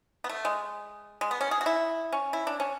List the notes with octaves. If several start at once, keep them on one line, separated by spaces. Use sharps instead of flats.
B3
A3
G#3
G#3
B3
C#4
G#4
F#4
E4
C#4
E4
D4
C#4